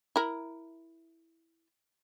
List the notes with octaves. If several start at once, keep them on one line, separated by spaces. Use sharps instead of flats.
E4 A#4